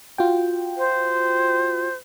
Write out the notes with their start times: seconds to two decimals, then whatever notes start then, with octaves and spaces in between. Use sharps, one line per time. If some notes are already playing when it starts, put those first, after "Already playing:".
0.18 F4 F#4 G5
0.78 C5